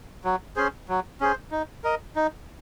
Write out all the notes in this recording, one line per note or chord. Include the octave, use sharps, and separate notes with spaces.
F#3
C#4 G#4 C5
F#3
C#4 G#4 C5
D#4
A#4 D#5
D#4